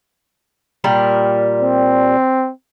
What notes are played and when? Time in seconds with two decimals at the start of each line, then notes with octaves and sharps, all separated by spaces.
0.84 A#2 G3 A#4
1.62 C4